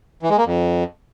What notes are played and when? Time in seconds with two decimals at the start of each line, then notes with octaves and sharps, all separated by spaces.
0.23 E3
0.30 G#3
0.38 A#3
0.45 F2